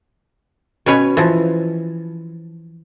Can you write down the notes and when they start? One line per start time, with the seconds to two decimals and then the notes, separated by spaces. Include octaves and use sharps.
0.86 B2 C#4 B4 C#5 G#5
1.17 E3 F3